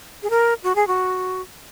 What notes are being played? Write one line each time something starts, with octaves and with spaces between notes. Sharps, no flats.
G#4
A#4
F#4
G#4
F#4